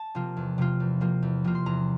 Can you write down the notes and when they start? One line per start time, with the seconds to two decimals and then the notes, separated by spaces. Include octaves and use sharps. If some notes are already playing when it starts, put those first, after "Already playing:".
Already playing: A5
0.15 C3 F3 A#3 F4
0.37 E2
0.58 C3 F3 A#3 F4
0.80 E2
1.01 C3 F3 A#3 F4
1.22 E2
1.44 C3 F3 A#3 F4
1.55 C6
1.66 E2 A#5